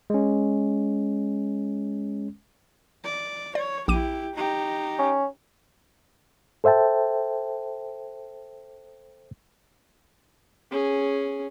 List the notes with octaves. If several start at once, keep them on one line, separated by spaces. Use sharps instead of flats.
G#3 C#4
D5
C#5 D5
A#1 E4 G4 D6 D#7
D#4 G4
C#4
A4 C5 E5 G5 A5
C#4 G#4